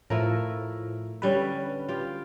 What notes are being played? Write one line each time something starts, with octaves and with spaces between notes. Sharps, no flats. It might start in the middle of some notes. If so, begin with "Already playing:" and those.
A2 F3 A3 E4 A#4
D3 G3 C#4 B4
F4 G4